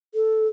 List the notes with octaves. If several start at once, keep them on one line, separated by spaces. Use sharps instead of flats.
A4